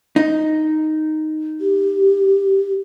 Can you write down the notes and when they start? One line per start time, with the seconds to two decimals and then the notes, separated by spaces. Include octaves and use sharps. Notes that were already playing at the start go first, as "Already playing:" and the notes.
0.16 D#4
1.60 G4